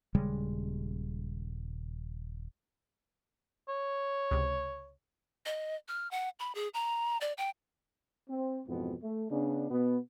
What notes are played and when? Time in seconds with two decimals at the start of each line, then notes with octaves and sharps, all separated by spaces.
0.15 D#1 C#3 G3 G#3
3.68 C#5
4.31 C#2 C3
5.46 D#5
5.88 F6
6.11 F#5
6.40 B5
6.55 G#4
6.74 A#5
7.21 D5
7.38 G5
8.30 C4
8.67 F2 G#2 B2 E3 B3
9.02 A3
9.31 C#3 B3 D4
9.70 B2 B3